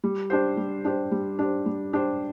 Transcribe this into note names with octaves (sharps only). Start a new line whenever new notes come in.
G3
D4 G4 C5
G3
D4 G4 C5
G3
D4 G4 C5
G3
D4 G4 C5